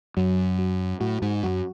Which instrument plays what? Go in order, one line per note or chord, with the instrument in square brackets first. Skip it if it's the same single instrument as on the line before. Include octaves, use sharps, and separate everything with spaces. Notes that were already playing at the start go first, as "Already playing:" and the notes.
[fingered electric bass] F#2 [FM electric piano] F#3
[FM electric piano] F#3
[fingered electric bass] A2 [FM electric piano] F#4
[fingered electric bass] G#2
[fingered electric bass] F#2 [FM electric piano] F#4